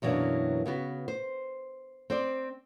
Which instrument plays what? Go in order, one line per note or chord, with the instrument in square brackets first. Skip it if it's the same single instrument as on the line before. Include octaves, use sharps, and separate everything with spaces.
[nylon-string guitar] F#2 B2 E3 F#3 A#3 D4
C#3 B3 F#4
C5
C4 C5 D5